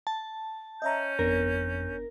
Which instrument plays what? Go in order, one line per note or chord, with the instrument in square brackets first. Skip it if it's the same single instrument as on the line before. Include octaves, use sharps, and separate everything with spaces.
[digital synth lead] A5
[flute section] C#4 G6 [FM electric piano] D#5 E5 A#5
[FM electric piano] G1 B3 D4 [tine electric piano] F2 [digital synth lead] A#4